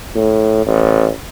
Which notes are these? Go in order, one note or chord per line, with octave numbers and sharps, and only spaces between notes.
A2
A1